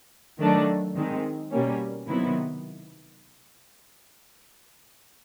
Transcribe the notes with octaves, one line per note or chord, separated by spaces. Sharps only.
D#3 F#3 A3 D4
D#3 G#3 C4
B2 G3 A#3 C#4
C3 D#3 F#3 B3 E4